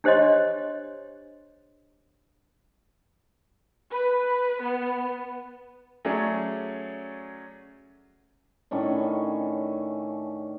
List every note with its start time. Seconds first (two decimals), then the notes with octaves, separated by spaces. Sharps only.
0.04 D4 G4 C5 C#5 D#5 C6
3.91 B4
4.62 B3
6.05 F#3 A3 C#4 G#4 D5
8.71 A2 D#3 C#4 D4